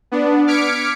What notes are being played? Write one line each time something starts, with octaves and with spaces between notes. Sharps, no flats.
B3 D4
D6 F6 G#6 B6 C#7 D7